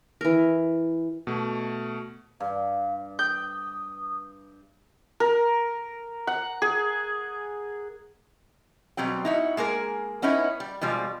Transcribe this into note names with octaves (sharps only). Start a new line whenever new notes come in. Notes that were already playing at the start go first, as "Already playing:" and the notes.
E3 A#4
B2 A3
G2 F5
G5 D#6 G6
A#4
F#5
G#4
B2 F#3 G3 C4 G5
D#4 E4 F#4
G#3 A#3 G#4 A#4
B3 C#4 D#4 E4 B4
G3
B2 F3 G3 G#3